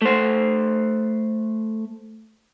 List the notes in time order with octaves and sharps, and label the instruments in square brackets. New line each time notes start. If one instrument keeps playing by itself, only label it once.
[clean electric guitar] A3 C5